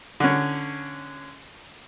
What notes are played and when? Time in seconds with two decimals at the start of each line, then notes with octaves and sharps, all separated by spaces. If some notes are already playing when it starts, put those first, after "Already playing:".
0.20 D3 C#4